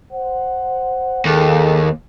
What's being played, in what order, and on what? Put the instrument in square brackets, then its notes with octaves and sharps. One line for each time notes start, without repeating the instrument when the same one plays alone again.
[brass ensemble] C5 F#5
[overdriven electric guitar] D#2 [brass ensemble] G#4 A4